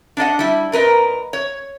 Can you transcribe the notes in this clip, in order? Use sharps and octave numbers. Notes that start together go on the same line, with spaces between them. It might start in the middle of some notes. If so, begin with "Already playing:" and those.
D4 D5 D#5 F#5
G3 E4
A#2 A#4 B4 D#5
C#5